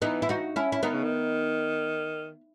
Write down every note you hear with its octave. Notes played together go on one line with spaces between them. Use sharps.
E3 B3 D#4
E4
D#4 F#4
C#4 E4
E4
D#3 B3 D#4
C#3
D#3